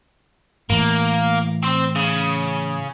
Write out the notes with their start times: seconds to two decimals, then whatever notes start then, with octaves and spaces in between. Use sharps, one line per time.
0.70 A2 E3 A#3
1.63 C4 C5
1.96 C#3